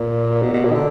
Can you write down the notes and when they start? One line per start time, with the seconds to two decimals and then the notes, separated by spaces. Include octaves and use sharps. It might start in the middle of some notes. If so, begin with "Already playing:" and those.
Already playing: A#2
0.42 B2
0.53 B2
0.64 A#2
0.70 D#3
0.75 D3